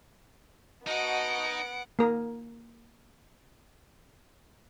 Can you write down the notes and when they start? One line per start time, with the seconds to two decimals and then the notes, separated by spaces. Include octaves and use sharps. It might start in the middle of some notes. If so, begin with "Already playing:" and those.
0.87 B3 D#4 F#4 D#5 F#5 A5 D7
1.99 A#3 A#4